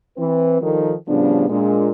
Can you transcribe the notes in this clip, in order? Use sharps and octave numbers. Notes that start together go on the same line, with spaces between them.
E3 C4 B4
D#3 F3 G3 D#4 A4 A#4
A2 C#3 F3 G3 B3 D4
A#2 G#3 D4